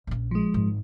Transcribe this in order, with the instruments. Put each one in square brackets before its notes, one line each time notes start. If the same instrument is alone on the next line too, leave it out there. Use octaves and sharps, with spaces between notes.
[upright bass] A#1 C#4
[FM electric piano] F3 G#3
[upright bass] G#1